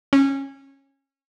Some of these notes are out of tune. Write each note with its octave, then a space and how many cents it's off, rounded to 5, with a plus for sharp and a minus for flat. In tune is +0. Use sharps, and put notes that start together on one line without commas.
C#4 -20